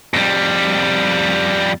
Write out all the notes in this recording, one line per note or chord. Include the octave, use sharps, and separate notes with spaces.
F2 G3